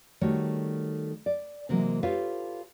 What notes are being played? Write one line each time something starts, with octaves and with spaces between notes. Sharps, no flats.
D#3 G3 A3 F#4 C#5
D5
C3 E3 F#3 G#3 A#3
F4 G4 A4 B4 C#5 F5